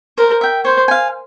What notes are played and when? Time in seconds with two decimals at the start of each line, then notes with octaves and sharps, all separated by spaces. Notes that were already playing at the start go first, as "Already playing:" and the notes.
0.18 A#4 C5
0.41 E5 G5
0.65 C5 C#5
0.88 F5 G#5